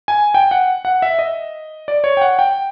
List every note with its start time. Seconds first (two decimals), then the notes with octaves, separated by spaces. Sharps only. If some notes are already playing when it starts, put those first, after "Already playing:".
0.08 G#5
0.34 G5
0.51 F#5
0.85 F#5
1.02 E5
1.19 D#5
1.88 D5
2.04 C#5
2.17 G5
2.22 F#5
2.39 G5